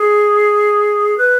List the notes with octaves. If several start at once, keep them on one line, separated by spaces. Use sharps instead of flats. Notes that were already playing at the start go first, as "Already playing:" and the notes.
Already playing: G#4
B4